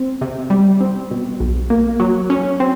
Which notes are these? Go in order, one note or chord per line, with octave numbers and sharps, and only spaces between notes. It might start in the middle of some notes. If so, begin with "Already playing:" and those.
Already playing: C4
C3
G3
C4
B2
B1
A#3
F#3
C#4
C4